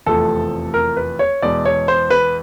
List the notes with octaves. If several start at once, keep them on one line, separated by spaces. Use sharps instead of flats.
F1 E2 C3 F3 A3 A4
A#4
B4
C#5
E2 B2 G#3 D5
C#5
C5
B4